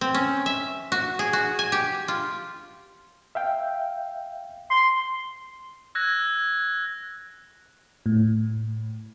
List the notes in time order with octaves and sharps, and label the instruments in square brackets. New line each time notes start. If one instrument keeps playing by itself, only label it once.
[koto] C4
C#4
E5
F#4
G#4
F#4
G#5
G4
F4
[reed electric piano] E5 F5 G5
[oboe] C6
[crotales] E6 F#6 G#6 A#6
[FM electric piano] A2